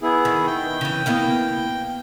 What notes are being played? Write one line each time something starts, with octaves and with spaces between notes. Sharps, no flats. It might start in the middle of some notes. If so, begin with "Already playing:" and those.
B3 E4 G#4
D#3
G5
C#3 E3
A#3 B3 E4